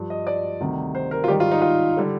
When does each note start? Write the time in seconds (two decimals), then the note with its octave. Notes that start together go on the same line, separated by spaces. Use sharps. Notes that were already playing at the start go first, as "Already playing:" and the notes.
Already playing: G2 F3
0.10 D#5
0.27 D5
0.60 D2 C3 D#3 G3
0.95 C5
1.11 A#4
1.24 F4
1.28 G#2 D#3 G3 G4
1.40 F4
1.51 D#4
1.62 F4
1.97 D3 G3